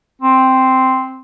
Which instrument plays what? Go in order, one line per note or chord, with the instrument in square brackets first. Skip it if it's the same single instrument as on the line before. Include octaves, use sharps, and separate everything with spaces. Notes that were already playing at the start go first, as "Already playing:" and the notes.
[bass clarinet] C4